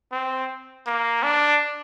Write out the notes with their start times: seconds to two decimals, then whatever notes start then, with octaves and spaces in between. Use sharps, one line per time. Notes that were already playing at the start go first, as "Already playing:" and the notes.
0.12 C4
0.86 A#3
1.23 D4